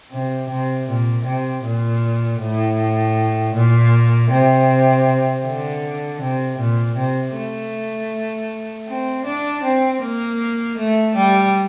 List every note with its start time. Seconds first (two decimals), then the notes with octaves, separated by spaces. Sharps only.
0.11 C3
0.49 C3
0.88 A#2
1.25 C3
1.64 A#2
2.40 A2
3.55 A#2
4.31 C3
5.45 D3
6.21 C3
6.59 A#2
6.96 C3
7.35 A3
8.88 C4
9.25 D4
9.63 C4
10.02 A#3
10.77 A3
11.16 G3